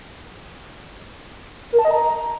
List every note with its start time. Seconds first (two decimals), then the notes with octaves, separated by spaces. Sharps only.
1.73 A#4
1.79 A5
1.85 D#5
1.91 A#5